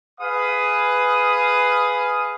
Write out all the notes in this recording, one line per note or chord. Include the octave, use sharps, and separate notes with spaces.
G#4 B4 F5 D#6